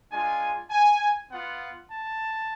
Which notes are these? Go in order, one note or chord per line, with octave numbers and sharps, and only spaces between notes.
G#3 D4 F4 G#5
G#5
B3 F4 F#5
A5